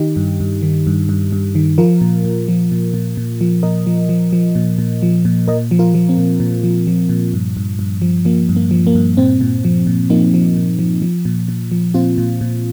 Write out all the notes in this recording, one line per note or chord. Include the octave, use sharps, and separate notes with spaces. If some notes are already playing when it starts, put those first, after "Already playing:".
Already playing: D#3 D#4 G4
G2
G2
D#3
G2
G2
G2
D#3
F3 F4 A#4
A#2
A#2
F3
A#2
A#2
A#2
F3
A#2 A#4 D#5
F3
F3
F3
A#2
A#2
F3
A#2
A#2 A#4 D#5
F3
F4 A#4
F3
C4
A#2
A#2
F3
F3
A#2
G2
G2
G2
F3
F3 A#3
G2
A#3
F3
A#3
G2
A#2 C4
A#2
F3
A#2
F3 A#3 D#4
F3
A#2
F3
F3
A#2
A#2
F3
A#2 C4 F4
A#2
A#2